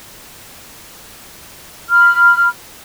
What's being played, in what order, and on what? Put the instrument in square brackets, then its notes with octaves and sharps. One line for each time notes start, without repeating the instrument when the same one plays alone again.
[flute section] B5 F6